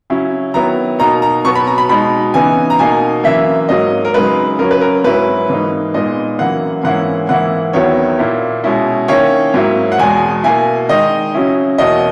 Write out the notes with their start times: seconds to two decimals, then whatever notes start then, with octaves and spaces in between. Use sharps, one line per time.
0.10 C#3 F#3 C#4 E4
0.54 D#3 F#3 B3 E4 A#5
0.99 B2 A#3 D#4 A#5
1.22 A#5
1.45 B2 F#3 B3 C#6
1.55 B5
1.67 A#5
1.78 B5
1.89 B2 G#3 D#4 B5
2.34 C#3 E3 B3 D#4 G#5
2.70 A#5
2.79 B2 A#3 D#4 G#5
3.24 F#2 E3 A#3 E5
3.69 G#2 F#3 A#3 D#5
4.05 A#4
4.14 F#2 C#3 G#3 D#4 B4
4.59 F#2 C#3 F#3 C#4 A#4
4.71 B4
4.81 A#4
5.04 G#2 F#3 C#4 E4 B4
5.50 G#2 E3 A#3 D#4
5.94 A#2 G#3 B3 D#4 D#5
6.39 F#2 E3 A#3 F#5
6.83 G#2 E3 A#3 C#4 E4 F#5
7.29 G#2 E3 A#3 E4 F#5
7.73 E2 D#3 F#3 B3 E4 C#5
8.19 A#2 A#3 E4
8.64 B2 G#3 C#4 E4
9.08 D#3 A#3 C#4 E4 C#5
9.54 G#2 F#3 A#3 E4
9.92 F#5
9.99 E2 B2 G#3 G#5
10.43 B2 A#3 E4 G#5
10.89 D#3 G#3 D#4 D#5
11.34 C#3 F#3 C#4 E4
11.78 E2 B2 A#3 C#4 E4 D#5